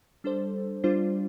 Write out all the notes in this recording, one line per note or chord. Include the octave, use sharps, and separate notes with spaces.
G3 D4 A4 C5
G3 D4 F4 C5